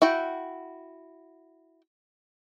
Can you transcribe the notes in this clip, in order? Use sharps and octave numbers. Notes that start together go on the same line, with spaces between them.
E4 F#4 G5